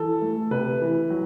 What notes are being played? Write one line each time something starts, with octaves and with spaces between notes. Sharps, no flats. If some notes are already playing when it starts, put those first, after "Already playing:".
Already playing: E3 A4
A3
C3 B4
E3
F#3